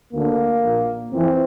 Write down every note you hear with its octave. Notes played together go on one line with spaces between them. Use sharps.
D2 D3 A#3
A#1 A#2
F2 E3 C4